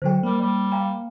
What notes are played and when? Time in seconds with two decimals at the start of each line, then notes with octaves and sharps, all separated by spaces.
0.02 D3 F#3 A4 C5 G5
0.23 G3 A#3
0.41 G3
0.72 F5 G5 A#5